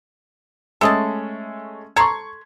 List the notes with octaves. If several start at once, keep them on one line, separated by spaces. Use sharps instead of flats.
G#3 A3 C#4 A4 D#5 A5
A4 A#5 C6 C#6 G#6